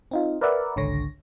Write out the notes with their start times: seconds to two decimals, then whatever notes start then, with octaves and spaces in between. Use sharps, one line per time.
0.11 C4 D#4 F4
0.41 A#4 B4 D5 E5 F#5
0.76 G#1 C#2 D3 C#5 A#6